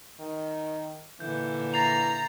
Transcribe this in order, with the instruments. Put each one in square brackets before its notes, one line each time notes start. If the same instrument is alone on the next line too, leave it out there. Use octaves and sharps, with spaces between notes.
[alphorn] D#3
[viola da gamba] A#2 D3 [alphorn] E3 [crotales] G6
[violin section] A#5 [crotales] A6 C7 F7